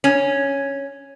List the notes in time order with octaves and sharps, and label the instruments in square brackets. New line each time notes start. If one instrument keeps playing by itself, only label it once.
[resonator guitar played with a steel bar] C#4